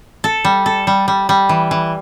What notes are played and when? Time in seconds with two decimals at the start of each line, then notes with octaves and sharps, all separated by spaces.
0.24 A4
0.45 G3
0.66 A4
0.87 G3
1.08 G3
1.29 G3
1.49 E3
1.71 E3